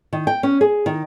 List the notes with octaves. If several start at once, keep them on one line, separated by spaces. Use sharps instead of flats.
D#3
G5
C#4
G#4
D#3